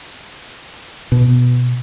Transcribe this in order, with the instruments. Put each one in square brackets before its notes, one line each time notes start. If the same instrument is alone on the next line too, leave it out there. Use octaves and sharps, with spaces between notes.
[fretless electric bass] B2